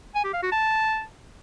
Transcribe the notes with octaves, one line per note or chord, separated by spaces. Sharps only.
G#5
G4
F5
F#4
A5